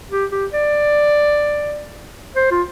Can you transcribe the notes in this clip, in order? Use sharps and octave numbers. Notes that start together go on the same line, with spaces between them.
G4
G4
D5
C5
F4